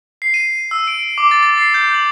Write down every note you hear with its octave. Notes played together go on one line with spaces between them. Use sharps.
C7
D#7
E6
D7
D6
A6
A6
C7
G6
F#7